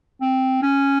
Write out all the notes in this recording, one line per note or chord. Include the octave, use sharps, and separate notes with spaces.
C4
C#4